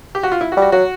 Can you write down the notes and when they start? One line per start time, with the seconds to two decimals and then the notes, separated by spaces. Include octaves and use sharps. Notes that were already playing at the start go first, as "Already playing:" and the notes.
0.15 G4
0.23 F#4
0.32 F4
0.41 E4
0.52 F#4
0.57 G3
0.62 F#4
0.72 F#3 F#4